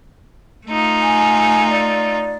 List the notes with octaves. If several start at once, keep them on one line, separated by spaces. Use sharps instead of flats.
A3 D#4 F4
G#5
D5